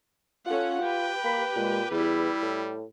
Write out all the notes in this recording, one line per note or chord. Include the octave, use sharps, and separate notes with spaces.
C#4 F4 A4 F#5
G4 B4 G5
A#3 B5
A#2 G#3
E2 G3 E4
A2